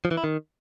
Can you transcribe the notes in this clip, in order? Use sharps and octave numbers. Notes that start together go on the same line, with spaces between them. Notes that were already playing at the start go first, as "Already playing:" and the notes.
F3
E3
E4
D#3